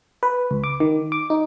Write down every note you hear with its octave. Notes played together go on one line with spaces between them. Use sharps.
B4
C#2
D6
D#3
D6
D#4